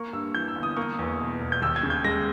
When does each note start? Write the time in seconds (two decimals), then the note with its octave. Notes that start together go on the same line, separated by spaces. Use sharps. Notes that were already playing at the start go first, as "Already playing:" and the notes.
Already playing: A#3 C#6
0.13 G2 E6
0.35 E3 G6
0.48 E6
0.56 G1
0.63 D#6
0.77 A#3 C#6
0.99 E2
1.20 B2
1.41 E1
1.52 G6
1.62 D#2 E6
1.76 G#6
1.83 C#3
1.90 G6
2.04 G#3 A#6